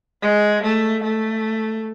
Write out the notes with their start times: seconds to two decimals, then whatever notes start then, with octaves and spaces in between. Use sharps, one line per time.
0.22 G#3
0.63 A3
1.04 A3